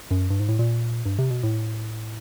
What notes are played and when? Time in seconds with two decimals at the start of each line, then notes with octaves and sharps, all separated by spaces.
0.11 F#2
0.30 G2
0.40 G#2
0.49 A2
0.59 A#2
1.06 G2
1.19 C3
1.31 B2
1.43 A2